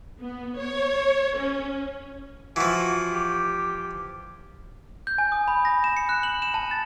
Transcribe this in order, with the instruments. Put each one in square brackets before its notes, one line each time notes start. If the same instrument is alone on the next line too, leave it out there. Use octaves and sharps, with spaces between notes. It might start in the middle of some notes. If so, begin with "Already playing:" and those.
[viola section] B3
C#5
C#4
[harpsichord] E3 F3 [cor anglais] F#4
[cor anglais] G4
[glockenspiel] G6
G#5
D#6
B5
A#6
E7
C#7
F#6
F#7
E7
A5
A6